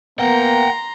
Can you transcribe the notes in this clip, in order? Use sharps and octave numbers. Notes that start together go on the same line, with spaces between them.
A#3 B3 F#5 G5 A#5 C6